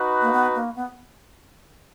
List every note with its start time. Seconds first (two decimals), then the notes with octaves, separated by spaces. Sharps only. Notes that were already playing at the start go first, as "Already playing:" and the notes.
Already playing: D#4 F#4 B4
0.21 A#3
0.32 B3
0.55 A#3
0.76 B3